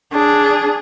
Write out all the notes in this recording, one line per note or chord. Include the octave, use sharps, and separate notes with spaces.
D4 G#4